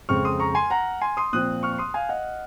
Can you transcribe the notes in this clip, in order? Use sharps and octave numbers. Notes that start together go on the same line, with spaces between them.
F2 C#3 G#3 C4 C#6 F6
C6 D#6
A#5 C#6
G#5 C6
F#5 A#5
G#5 C6
C6 D#6
A#2 F3 C4 D#6 F#6
C#6 F6
C#6
C6 D#6
F5 G#5
D#5 F#5